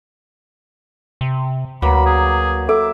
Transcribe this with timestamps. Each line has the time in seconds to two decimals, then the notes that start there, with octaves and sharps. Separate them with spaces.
1.21 C3
1.82 D2 F#3 A#3 B4 B5
2.06 G#4
2.69 A4 E5 D6